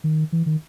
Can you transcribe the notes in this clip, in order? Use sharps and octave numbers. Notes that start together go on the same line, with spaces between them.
D#3
E3
D#3